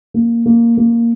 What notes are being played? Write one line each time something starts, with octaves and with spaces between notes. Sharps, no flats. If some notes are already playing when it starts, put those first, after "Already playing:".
A#3
A#3
A#3